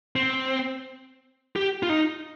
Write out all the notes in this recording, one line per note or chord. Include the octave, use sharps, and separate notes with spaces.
C4
G4
F4
D#4